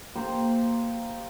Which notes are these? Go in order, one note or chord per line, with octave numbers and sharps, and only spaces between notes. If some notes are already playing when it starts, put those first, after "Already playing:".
A#3 G4 C5